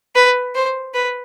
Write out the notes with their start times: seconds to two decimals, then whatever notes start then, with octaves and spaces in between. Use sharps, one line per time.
0.16 B4
0.55 C5
0.94 B4